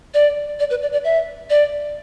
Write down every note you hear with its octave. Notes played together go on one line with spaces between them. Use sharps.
D5
D5
B4
D5
D5
E5
D5